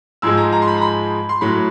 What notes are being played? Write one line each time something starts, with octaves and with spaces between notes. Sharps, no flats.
G#2 F3 G#3 E6
A#5
A#5
C6
B5
A#5
B5
C6
A2 F#3 B5